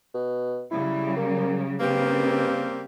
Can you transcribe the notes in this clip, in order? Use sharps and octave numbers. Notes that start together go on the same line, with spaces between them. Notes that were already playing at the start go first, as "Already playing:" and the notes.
B2
C#3 F#3 G3 E4
A#3
G2 C#3 G3 A#3 C4